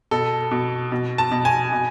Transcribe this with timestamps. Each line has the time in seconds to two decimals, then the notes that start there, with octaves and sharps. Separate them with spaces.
0.11 B2 A4
0.51 B2
0.92 B2
1.18 A5
1.31 B2
1.45 G#5
1.72 B2